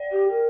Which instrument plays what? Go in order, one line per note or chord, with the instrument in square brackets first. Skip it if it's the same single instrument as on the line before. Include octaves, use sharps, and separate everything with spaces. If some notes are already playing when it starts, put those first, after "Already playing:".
Already playing: [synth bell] D5 G5
[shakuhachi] G4
A#4